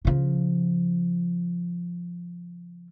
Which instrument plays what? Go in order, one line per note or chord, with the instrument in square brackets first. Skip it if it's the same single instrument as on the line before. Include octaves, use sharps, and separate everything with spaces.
[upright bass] C#3 F3